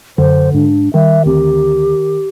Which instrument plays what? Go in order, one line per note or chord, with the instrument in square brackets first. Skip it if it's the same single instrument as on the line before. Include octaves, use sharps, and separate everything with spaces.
[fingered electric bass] F#2 [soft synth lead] D3 [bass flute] C5
[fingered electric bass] G#2 [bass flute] D4
[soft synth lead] D#3 [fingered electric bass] G3 [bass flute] E5
[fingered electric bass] D2 C4 [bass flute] G4